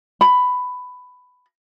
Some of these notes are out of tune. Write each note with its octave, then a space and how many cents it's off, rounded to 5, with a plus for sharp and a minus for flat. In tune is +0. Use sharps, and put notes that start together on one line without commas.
B5 +10